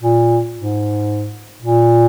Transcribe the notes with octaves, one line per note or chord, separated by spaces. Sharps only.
A#2
G#2
A#2